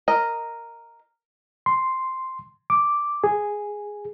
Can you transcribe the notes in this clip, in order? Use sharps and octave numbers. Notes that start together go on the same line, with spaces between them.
A#4 D#5
C6
D6
G#4